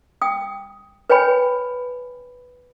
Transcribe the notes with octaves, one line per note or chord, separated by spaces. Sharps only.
G5 D#6
B4 C#5 G5 G#5 B5